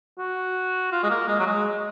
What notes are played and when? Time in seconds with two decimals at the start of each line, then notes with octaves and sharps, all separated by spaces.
0.18 F#4
0.92 F4
1.03 G#3
1.10 A#3
1.28 G#3
1.39 F#3
1.46 G#3